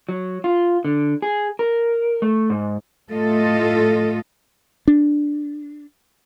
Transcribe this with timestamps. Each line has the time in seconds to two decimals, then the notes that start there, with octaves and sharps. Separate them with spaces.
0.09 F#3
0.44 F4
0.85 D3
1.22 G#4
1.59 A#4
2.22 A3
2.50 G#2
3.11 A2 A3 F4 A4 D#5
4.88 D4